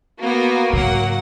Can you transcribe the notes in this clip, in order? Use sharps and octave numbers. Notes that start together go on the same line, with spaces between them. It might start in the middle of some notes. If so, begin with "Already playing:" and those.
A#3 B3 F#4 A#4
G#2 C#3 F#3 F#5